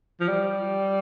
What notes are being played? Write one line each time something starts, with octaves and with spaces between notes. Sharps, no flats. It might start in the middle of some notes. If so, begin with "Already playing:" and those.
F3
G3